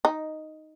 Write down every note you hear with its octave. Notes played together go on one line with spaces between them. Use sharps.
D#4